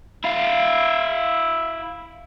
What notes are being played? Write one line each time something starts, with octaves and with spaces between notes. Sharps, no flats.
E4 F5